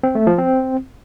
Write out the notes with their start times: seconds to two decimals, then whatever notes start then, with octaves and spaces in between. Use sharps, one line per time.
0.03 C4
0.15 A3
0.27 F3
0.38 C4